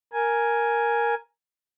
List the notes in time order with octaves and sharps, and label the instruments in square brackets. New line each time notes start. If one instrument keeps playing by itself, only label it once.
[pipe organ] A#4 G#5